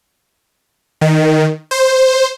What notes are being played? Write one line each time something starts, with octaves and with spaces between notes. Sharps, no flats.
D#3
C5